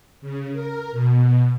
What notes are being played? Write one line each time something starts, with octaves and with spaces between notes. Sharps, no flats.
C#3
A#4
B2